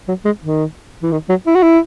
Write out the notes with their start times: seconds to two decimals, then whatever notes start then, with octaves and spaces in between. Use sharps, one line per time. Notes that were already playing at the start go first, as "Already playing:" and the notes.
0.08 F#3
0.25 G#3
0.44 D#3
1.03 E3
1.12 D#3
1.29 F#3
1.47 E4
1.55 F#4
1.63 E4